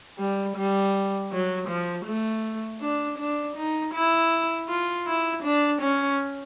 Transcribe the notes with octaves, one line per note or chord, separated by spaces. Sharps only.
G3
G3
F#3
F3
A3
D4
D4
D#4
E4
F4
E4
D4
C#4